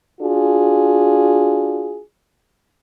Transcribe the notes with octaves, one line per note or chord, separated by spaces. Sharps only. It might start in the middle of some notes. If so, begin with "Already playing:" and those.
D4 F4 F#4 G#4